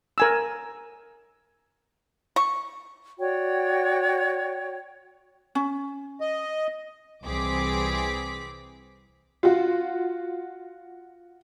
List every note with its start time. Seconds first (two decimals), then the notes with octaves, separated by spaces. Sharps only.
0.18 A#4 G#5 E6
2.36 C#6
3.19 F#4 C#5 D5 G5
5.55 C#4
6.21 D#5
7.24 C2 E3 C4 G#4 D6 B6
9.43 F4 F#4